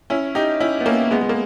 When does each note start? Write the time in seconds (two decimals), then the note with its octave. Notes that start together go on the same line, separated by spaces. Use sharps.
0.10 C#4 E4
0.35 D#4 G4
0.60 C#4 E4
0.80 B3
0.85 A#3 C#4
1.11 G#3 B3
1.21 G#3
1.29 A#3